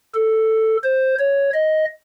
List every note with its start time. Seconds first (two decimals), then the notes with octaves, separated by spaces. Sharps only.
0.14 A4
0.84 C5
1.19 C#5
1.54 D#5